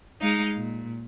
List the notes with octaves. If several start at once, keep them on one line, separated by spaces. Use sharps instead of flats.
G#3 D#4 F5
A#2